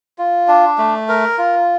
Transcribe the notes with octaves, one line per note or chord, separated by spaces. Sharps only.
F4
D4
A3
A#4
F4